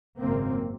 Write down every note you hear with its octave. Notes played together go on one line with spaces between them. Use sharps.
G#1 F#2 C#3 A#3 C4